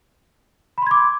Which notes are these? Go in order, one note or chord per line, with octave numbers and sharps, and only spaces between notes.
B5 C6 D6 G#6